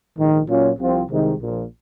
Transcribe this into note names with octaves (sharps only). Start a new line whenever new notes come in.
A#1 G#2 D#3
A#2 F#3 C#4 F4
C2 C3 F3 C4 F4
C2 C3 D#3 G#3 D#4
A#1 A#2 F3